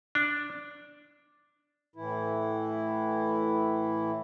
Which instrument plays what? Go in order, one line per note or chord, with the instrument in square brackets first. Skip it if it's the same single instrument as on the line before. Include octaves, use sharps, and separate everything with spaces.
[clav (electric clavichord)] D4
[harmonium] A2 E3 E4